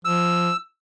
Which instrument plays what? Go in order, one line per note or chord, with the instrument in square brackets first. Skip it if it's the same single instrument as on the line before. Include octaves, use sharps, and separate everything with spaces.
[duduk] F3 [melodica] E6